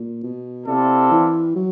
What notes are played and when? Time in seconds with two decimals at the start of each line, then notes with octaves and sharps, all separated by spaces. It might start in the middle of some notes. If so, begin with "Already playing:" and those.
Already playing: A#2
0.23 B2
0.67 C3 C4 E4 A4 D5 F5
1.12 E3
1.56 F#3